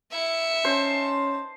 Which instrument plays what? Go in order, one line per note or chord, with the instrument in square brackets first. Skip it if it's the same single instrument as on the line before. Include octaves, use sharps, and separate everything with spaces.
[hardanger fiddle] E4 [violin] E5 C#7
[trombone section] C#4 [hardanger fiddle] D#4 A5 [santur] C5